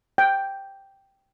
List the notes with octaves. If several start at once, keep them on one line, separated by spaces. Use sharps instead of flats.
G5